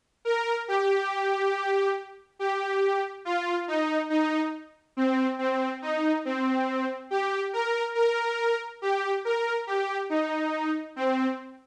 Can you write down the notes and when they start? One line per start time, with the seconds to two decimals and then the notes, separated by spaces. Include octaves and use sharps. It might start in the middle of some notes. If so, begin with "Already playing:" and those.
0.25 A#4
0.68 G4
2.39 G4
3.25 F4
3.68 D#4
4.10 D#4
4.97 C4
5.39 C4
5.82 D#4
6.25 C4
7.11 G4
7.53 A#4
7.95 A#4
8.82 G4
9.25 A#4
9.67 G4
10.10 D#4
10.96 C4